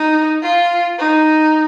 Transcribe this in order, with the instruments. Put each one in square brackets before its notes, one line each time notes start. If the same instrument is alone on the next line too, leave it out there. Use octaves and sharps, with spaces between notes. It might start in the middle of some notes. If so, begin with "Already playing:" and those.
Already playing: [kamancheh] D#4
F4
D#4